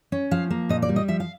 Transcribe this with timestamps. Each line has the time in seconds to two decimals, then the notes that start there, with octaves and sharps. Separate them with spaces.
0.12 C#4
0.31 F3 F5
0.50 A#3
0.69 A#2 D#5
0.82 D5
0.89 G3
0.96 D#5
1.08 F3 E5
1.20 F5